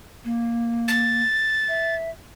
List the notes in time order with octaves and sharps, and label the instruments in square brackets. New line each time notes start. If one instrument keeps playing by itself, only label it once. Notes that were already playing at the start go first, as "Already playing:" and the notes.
[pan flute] A#3
[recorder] A6
[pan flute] E5